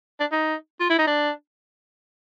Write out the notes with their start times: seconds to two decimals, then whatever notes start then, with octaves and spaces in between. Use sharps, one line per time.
0.20 D4
0.32 D#4
0.80 F4
0.90 E4
0.98 D#4
1.07 D4